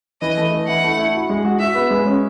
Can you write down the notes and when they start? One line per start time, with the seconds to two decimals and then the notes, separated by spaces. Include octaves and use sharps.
0.22 E3 D#5
0.37 A3
0.52 E3
0.67 E4 F#5
0.84 A3
0.99 E4
1.14 F#4
1.29 G#3
1.45 F#4
1.60 F#4 E5
1.75 B3
1.90 G#3
2.06 C#4